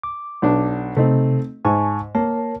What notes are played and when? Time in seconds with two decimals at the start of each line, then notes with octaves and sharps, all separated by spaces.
0.03 D6
0.42 B1 D4
0.97 C3 A3 C4 D#4
1.65 G#2 G#5 A5 C#6
2.15 A#3 A#4 C#5 A5